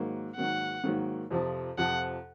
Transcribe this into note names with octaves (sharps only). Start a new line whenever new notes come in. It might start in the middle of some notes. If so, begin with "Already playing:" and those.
Already playing: G#2 D#3 F#3 A#3
G#2 D#3 F#3 A#3 F#5
G#2 D#3 F#3 A#3
F2 C3 F3
F2 C3 F3 F#5